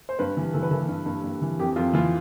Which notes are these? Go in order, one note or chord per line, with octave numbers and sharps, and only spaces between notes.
C5
G2 B4
E3
E3 A4
B4
E3 A4
G2
G2
G2
E3
F2 G4
F2 F4
E3 F4